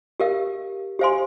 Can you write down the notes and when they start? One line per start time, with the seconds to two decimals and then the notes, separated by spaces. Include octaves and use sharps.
0.20 G4 A#4 F5
0.99 G4 C5 F5 G#5 C6